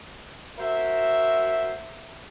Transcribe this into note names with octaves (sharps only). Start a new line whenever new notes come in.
F#4 A#4 C5 E5